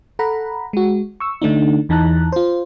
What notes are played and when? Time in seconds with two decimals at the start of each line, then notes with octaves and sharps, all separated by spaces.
0.19 A4 F#5 A#5 B5
0.73 G#3 F#4
1.20 C#6 E6
1.42 D3 A3 D4 D#4
1.89 E2 E3 D#4 A5 A#5 F#6
2.32 F4 C5